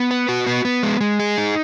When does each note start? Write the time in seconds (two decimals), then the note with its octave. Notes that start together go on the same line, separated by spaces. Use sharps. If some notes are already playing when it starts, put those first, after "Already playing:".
Already playing: B3
0.11 B4
0.29 F#4
0.46 B3
0.65 B3
0.83 G#3
1.01 G#3
1.20 G#4
1.38 D#4